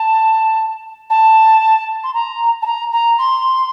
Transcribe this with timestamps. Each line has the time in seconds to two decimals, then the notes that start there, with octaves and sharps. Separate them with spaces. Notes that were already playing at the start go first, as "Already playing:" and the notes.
Already playing: A5
1.10 A5
2.03 C6
2.13 A#5
2.62 A5
2.66 A#5
2.92 A#5
3.18 C6